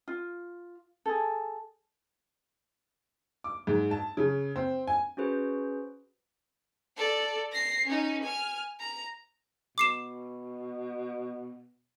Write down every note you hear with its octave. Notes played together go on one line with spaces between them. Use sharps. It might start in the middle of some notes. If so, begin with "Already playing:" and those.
F4
G#4 A4
D6
G#2
A5
C#3
C4
G#5
C#4 F#4 G#4 B4 C5
A4 D5
A#6 C7
C#4 D#4
G#5 F6
A#5
B2 D6 C7 E7